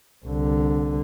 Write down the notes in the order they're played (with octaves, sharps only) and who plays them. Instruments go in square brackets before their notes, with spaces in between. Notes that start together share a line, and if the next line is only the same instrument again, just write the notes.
[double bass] C2 D3